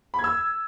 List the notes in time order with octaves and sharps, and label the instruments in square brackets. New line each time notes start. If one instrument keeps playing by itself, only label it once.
[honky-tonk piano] B5
G#6
E6